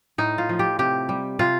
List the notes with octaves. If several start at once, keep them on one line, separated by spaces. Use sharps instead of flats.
A2 D#4
F4
F3
G4
C3 G4
G3
C3 F4